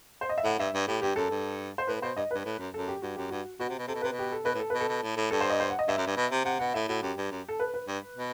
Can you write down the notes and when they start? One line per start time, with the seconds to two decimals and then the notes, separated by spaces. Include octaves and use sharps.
0.21 C5
0.29 D#5
0.38 E5
0.44 A2 F#5
0.59 G2 E5
0.74 G2
0.88 A2 G4
1.02 G2 G4
1.16 F#2 A4
1.31 G2
1.78 C5
1.87 A2 B4
2.02 B2 C5
2.17 G2 D#5
2.31 G2 B4
2.45 A2
2.59 F#2
2.74 F#2 A4
2.88 G4
3.02 G2 F#4
3.16 F#2 G4
3.30 G2 F#4
3.60 B2 F#4
3.69 C3
3.78 B2
3.87 C3 A4
3.95 B2
4.02 C3 B4
4.12 B2
4.19 G4
4.32 A4
4.45 B2 B4
4.54 A2
4.60 A4
4.70 B2 B4
4.80 A4
4.89 B2
5.03 A2
5.17 A2
5.31 G2 A4
5.41 C5
5.50 D#5
5.60 C5
5.70 F#5
5.79 D#5
5.88 G2 E5
5.98 F#2
6.07 G2
6.16 B2
6.32 C3
6.45 C3 F#5
6.59 B2 F#5
6.74 A2 E5
6.88 A2 F#4
7.02 F#2 G4
7.18 G2
7.31 F#2
7.48 A4
7.60 B4
7.74 B4
7.88 G2
8.17 B2